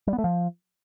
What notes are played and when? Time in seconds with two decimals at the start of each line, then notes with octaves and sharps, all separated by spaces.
0.07 G3
0.13 B3
0.18 A3
0.24 F3